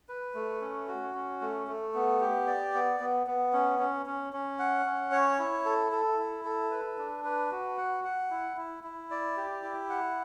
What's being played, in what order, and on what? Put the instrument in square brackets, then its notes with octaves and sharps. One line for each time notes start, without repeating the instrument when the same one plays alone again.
[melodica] B4
A3
C#4
F#4
C#4
A3
A3
B3
G4
D5
B3
B3
B3
C#4
C#4
C#4
C#4
F#5
C#4
C#5
E4
A4
A4
E4
A4
B4
D4
B4
F#4
F#5
F#5
E4
E4
E4
D5
G4
E4
F#5